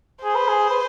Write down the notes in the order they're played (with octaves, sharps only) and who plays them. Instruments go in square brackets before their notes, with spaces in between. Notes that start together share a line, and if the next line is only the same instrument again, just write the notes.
[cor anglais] G#4 [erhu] C5
[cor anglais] B4
G#4
B4